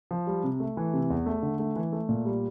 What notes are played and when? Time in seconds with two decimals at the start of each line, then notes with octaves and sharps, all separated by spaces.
0.11 F3
0.27 G3
0.43 C3
0.60 A3
0.77 E3
0.93 C3
1.10 E2
1.26 A3
1.43 D3
1.59 A3
1.76 E3
1.92 A3
2.09 A#2
2.25 G3